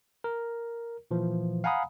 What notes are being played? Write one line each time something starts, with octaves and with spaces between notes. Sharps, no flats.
A#4
A#2 E3 F3
F5 F#5 G#5 A#5 B5 D#6